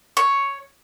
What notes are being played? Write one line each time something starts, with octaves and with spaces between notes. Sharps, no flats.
C#5